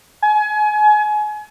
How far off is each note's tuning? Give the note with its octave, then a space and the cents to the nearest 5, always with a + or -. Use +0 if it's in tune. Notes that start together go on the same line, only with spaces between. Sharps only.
G#5 +30